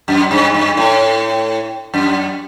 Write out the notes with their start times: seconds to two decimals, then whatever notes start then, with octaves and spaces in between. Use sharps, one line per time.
0.08 F#2
0.31 G2
0.54 G2
0.77 A2
1.94 F#2